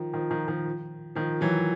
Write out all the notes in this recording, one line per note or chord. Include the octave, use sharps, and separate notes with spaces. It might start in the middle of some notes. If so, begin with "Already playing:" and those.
Already playing: D#3 F3
D#3 F3
D#3 F3
D#3 F3
D#3 F3
E3 F#3